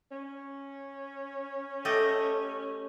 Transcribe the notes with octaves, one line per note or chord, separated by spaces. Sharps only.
C#4
A3 G4 A4 D#5